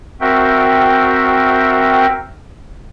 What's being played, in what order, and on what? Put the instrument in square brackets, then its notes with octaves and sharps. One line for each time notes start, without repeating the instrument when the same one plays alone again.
[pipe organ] C4 F#4 A#4 E5 G5